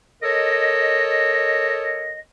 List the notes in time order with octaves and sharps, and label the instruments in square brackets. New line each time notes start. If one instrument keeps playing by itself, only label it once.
[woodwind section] A4 A#4 C#5 D#5